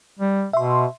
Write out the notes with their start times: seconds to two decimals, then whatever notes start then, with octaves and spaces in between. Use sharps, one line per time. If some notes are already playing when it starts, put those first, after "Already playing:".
0.19 G3
0.53 B2 E5 C6